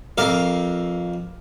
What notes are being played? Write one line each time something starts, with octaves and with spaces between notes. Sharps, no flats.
F2 A#4 F5 D6